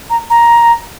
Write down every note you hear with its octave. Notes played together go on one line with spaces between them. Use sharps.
A#5
A#5